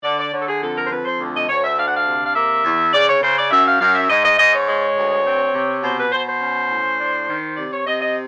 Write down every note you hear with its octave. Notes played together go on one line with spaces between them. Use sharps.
D3 D5
D5
D3 C#5
A4
G#4
F2 A4
A#4
C5
F2 B4
C5
D2
D#5
D2 C#5
E5
D4 F5
F#5
F5
C3
F5
A#3 E5
E2
C#3 D5
C#5
C#3 C5
D5
F#2 E5
F5
F#2 F5
E5
G#2 D#5
D#5
G#2 D#5
C#5
G#3
D2
C4
C3
B2 C5
B4
B2 C5
C5
C#4
A2
D4
D#3
C3 D5
C#5
C3 D#5
D#5